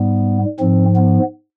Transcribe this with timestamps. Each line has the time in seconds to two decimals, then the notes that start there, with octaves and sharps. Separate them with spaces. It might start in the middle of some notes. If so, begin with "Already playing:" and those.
Already playing: G#2 G3 B3
0.60 G#2 F3 C4
0.96 B3